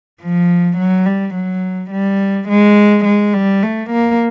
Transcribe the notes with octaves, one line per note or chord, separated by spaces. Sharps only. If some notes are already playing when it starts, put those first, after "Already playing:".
F3
F#3
G3
F#3
G3
G#3
G#3
G3
A3
A#3